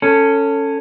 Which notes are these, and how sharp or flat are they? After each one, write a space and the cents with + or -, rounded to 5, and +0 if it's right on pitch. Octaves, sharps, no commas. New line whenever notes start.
C#4 +0 A4 +20